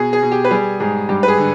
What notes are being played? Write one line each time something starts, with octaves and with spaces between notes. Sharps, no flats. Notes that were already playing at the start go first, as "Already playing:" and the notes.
Already playing: B2 G#4
G#4
B2
G4
B4
G3 G#4
G#2 G#4
G2 G4
B4
G#4
D3